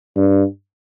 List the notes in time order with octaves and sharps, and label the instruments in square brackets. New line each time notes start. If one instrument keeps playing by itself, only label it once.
[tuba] G2